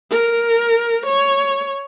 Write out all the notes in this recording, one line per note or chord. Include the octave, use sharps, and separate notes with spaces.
A#4
C#5